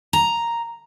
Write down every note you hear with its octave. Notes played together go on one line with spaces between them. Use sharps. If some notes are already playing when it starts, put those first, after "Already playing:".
A#5